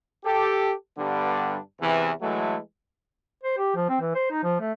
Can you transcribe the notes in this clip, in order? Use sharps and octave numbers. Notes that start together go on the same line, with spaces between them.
G4 A4
G2 D3 G3 B3 D4
E2 C3 E3
E3 F#3 G#3 A3
C5
G4
F3
C4
E3
C5
D#4
F3
A3